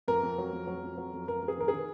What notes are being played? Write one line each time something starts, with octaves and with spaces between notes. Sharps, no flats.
F2 A#4
F2
F#3
F2
F#3
F2
F#3
F2
F2 A#4
F2
G#4
D#3 A#4
G#4
D#3